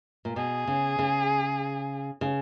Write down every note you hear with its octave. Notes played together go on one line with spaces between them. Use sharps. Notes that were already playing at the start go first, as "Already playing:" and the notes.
A#2
B2 G#4
C#3
C#3
C#3